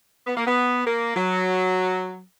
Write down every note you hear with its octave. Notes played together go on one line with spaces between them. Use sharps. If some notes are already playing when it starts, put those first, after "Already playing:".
B3
A#3
B3
A#3
F#3